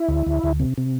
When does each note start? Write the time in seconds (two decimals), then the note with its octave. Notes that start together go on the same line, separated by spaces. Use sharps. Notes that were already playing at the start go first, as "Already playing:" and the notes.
Already playing: E4
0.08 D2
0.26 D2
0.43 D2
0.60 C3
0.78 C3